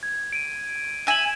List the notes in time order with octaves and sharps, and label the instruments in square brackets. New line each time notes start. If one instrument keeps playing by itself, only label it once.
[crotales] G#6
D7 D#7
[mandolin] E5 G#5 [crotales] D#7 E7 F#7